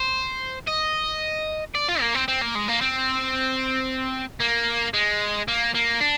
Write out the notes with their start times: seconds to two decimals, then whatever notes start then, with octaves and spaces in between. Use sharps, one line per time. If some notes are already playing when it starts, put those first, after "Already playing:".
Already playing: C5
0.68 D#5
1.75 D5
1.88 F4
2.01 A#3
2.15 C4
2.28 C4
2.42 A#3
2.55 G#3
2.68 A#3
2.81 C4
4.40 A#3
4.94 G#3
5.48 A#3
5.74 A#3
6.00 D4